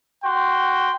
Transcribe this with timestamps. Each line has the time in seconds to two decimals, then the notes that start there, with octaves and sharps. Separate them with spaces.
0.23 F#4 G5 C6